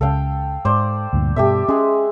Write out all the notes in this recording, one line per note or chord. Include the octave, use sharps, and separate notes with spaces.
C#2 C#3 A4 F5 G5
G#2 C5 D5
D2 G2 A#2
G2 B2 G4 A4 E5
G#3 C#4 G#4